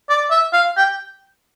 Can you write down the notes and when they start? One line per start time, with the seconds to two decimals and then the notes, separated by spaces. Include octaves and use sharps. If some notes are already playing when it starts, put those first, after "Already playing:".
0.09 D5
0.31 E5
0.53 F5
0.77 G5